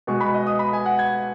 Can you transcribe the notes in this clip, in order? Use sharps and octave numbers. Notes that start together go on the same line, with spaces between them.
B2 G#3 C#6
B5
D#5
D#6
B5
G#5
F#5
G#6